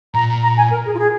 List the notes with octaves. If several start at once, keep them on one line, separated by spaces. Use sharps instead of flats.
A#2 A#5
A#5
G#5
A#4
G#4
F4
G#4